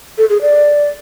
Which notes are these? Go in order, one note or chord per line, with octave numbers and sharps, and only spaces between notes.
A4
G#4
D5